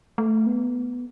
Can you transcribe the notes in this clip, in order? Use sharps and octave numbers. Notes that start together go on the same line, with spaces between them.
A3
B3